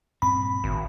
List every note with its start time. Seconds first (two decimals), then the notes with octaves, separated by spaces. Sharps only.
0.22 G2 A#2 C4 B5
0.64 G#1 A2